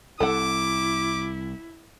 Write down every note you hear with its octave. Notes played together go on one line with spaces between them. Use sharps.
C2 E4 A4 F#5 D6